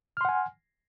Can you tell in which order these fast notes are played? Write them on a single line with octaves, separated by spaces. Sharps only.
F6 C6 F#5 G#5